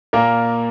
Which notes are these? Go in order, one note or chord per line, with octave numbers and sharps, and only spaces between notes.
A#2 A#3 A#4